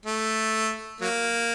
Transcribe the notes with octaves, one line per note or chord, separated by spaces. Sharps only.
A3
F#3 A#3